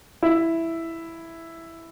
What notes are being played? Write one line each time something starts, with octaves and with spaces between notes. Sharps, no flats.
E4